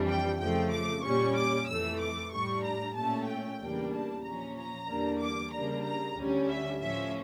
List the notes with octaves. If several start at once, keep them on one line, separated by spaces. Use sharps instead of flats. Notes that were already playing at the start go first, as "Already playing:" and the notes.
Already playing: F2 E3 G3 D4
G5
F2 C#3 F3 A3 G5
D6
A#2 G3 C#4 C#6
D6
F2 E3 A3 E6
D6
A2 G3 D4 C#6
A#5
A#2 A3 C#4 A5
G5
E2 C#3 G3 A#3 D4
A5
A#2 F3 C#4 A#5
A#5
E2 D3 G3 A#3 D4
D6
C#3 G3 A#3 D4 A#5
A#5
D2 D3 G3 C#4
E5
A2 F3 C#4 E5